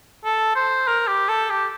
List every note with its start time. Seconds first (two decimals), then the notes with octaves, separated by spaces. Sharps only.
0.24 A4
0.55 C5
0.87 A#4
1.07 G4
1.29 A4
1.50 G4